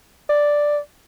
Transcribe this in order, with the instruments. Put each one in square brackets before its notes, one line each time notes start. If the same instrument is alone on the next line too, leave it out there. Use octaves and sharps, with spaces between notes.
[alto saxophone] D5